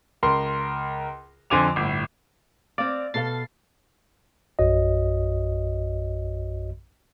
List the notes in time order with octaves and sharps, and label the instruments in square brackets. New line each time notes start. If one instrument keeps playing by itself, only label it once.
[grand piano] C#2 A#4 C6
F2 D3 C5 G#5 D6 F7
G1 A2
[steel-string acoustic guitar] C4 F5 [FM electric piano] D5
[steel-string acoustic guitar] B2 A4 F5 [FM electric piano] A6 C7
[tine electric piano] A#1 F#2 F#4 C#5 D#5